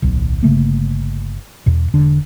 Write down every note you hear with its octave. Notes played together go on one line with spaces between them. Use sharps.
D1 B1
G1 C#3 A3 A#3
E2 B2
E1 D3 D4